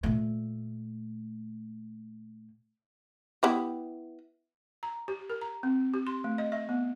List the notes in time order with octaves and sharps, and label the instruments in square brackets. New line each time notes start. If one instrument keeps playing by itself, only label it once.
[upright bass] A#2 A3
[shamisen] B3 E4 G4
[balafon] A#5
G4
A#4
A#5
C4
G4
C6
A3
D#5
E5
B3